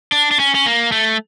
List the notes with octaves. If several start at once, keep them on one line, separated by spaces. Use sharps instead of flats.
D4
D4
C#4
C#4
A#3
A3